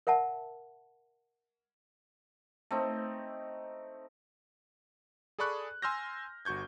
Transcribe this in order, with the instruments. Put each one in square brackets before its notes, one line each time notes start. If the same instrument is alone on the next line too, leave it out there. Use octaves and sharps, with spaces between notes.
[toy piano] A#4 E5 F#5 A5
[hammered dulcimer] A3 C4 D#4
[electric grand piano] G#4 A4 D5 B5 C#6 F#6
G#5 C6 E6 F6 G6 A#6
G1 F#4 C#6 G6 G#6